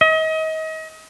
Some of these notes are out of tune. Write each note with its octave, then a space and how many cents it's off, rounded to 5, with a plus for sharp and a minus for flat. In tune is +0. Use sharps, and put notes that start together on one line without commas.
D#5 +35